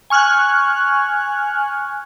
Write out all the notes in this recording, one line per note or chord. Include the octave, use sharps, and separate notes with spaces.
G#5 C#6 F6 F#6 G#6